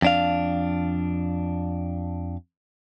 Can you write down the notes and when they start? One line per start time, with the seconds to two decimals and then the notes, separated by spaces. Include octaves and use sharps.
0.02 F2 D4 F5